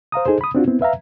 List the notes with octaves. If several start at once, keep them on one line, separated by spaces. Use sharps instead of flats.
C5 F5 A#5 D#6
D#4 G#4 A4 C5
B5 D#6
C4 D4 F4 F#4
B3 C4 E4
B4 E5 F5 A#5